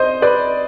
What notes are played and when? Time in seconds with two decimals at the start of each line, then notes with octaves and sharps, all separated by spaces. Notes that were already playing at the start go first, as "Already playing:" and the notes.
Already playing: C5 D#5
0.22 B4 D5